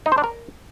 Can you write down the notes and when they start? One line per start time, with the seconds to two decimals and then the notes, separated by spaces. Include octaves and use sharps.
0.06 D#4
0.12 C5
0.18 D4
0.24 A#4